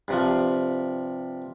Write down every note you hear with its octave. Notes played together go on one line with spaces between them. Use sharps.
G2 C3 F3